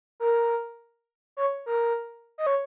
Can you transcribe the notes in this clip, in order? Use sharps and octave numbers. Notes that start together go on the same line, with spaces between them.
A#4
C#5
A#4
D#5
C#5